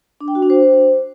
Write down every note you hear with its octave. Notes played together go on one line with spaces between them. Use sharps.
D4
G5
F#4
D4
C5